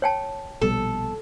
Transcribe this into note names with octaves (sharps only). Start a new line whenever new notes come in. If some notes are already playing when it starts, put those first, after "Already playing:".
C#5 G5 A5
A#1 B2 G3 A4